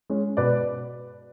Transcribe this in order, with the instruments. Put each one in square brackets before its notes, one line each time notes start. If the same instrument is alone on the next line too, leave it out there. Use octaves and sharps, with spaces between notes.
[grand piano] G#3 C#4
B2 B4 D5